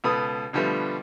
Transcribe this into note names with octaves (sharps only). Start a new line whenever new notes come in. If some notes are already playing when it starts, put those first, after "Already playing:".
C#2 B2 A4 B4 D#6
B2 D3 F3 G3 A3 B3